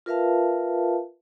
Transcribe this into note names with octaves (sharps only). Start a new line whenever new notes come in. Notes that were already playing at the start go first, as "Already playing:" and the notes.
F4 A#4 B4 E5 F5 A5